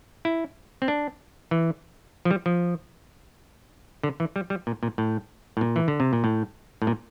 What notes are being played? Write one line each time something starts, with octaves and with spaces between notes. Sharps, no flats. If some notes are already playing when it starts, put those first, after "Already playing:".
E4
C4
D4
E3
F3
G3
F3
D3
E3
G3
G3
A#2
A#2
A2
A2
A#2
E3
D3
C3
A#2
A2
A2
A#2